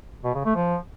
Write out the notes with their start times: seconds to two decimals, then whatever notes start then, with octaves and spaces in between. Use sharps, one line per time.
0.24 B2
0.35 C#3
0.45 A3
0.56 F3